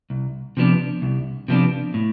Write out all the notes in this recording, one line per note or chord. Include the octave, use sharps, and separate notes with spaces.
C2
C3 F3 B3 D4
C2
C3 F3 B3 D4
A2